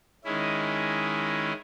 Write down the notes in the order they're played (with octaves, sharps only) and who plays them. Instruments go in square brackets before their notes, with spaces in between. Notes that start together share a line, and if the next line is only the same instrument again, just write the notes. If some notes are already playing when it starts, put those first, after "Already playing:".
[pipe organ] D#3 G#3 C#4 E4